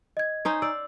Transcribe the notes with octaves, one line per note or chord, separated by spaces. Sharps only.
D#5 G#6
C#4 D#4 C5
D5 E6